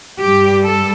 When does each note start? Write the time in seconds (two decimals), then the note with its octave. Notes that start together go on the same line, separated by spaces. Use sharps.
0.18 G2 G3 G4
0.65 A4